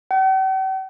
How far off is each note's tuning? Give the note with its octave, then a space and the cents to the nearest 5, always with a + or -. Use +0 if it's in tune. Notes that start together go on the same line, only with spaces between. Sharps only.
G5 -45